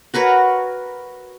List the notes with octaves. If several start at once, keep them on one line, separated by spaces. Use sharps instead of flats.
F#4 A#4 B4 C#5